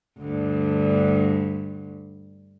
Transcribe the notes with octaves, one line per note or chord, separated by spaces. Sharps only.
D2 G2